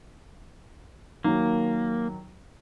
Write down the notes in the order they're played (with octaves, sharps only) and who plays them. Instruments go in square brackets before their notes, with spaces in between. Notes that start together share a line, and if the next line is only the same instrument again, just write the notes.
[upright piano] D#3 F#3 [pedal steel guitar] A#3